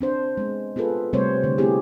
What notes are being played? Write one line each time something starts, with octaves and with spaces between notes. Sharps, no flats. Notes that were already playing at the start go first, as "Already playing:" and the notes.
C4 D4 C5
G#3 B3
B3 F4 G#4 A4 B4
C3 G3 A3 C4 C5 C#5
D3 A3
A3 B3 C4 E4 G4 G#4